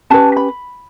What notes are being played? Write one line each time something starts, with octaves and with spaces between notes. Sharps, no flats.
C#4 G4 B4 A5
B5